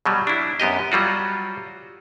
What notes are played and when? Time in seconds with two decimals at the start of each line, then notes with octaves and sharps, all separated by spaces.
0.06 B2 F#3 G3
0.27 D4 E4
0.60 F#2 B3 G4 D#5
0.92 F#3 G3 F4 F#4